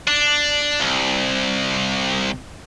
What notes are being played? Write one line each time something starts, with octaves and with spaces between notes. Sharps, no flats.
D4
C2